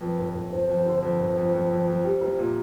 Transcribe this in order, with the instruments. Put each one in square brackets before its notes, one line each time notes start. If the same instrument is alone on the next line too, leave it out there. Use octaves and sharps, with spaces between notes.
[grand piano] F2 [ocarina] B4
[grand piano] G1
G1
[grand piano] G1 [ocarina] C5
[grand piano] F2
D3
[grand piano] F2 [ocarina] C5
[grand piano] G1
F2
F2
F2
F2
G3
C2
A#2